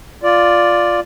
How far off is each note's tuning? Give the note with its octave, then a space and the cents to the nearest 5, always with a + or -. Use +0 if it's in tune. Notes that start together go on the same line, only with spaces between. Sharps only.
F4 +0 D5 +0